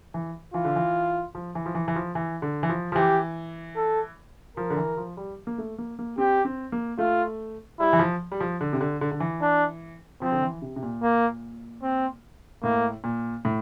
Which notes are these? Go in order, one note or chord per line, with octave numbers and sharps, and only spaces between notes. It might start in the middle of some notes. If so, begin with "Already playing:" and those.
E3
E3 F4
D3
E3
F3
E3
F3
E3
E3
F3
E3
D3
E3
F3
F3
E3 G4
A4
F3 A#4
D3
E3
F3
G3
A#3
A3
A#3
A#3
C4 G4
C4
A#3
A3 F4
G3 E4
E3
F3
G3
F3
D3
C3
D3
D3
D3
E3
D4
F3 C4
D3
E3
C3
C3
A#2
A#3
C4
A2 A#3
A#2
A2